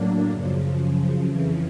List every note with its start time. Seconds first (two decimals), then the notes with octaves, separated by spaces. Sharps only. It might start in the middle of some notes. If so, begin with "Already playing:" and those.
Already playing: A2 F#3 A#3 D4
0.29 F#2 C#3 F3
1.24 F2 C#3 E3